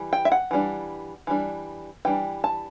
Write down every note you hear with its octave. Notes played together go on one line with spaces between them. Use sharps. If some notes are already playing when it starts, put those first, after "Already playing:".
Already playing: E3 G3
G5
E5
F#5
E3 G3 D4
E3 G3 D4
E3 G3 D4 G5
A5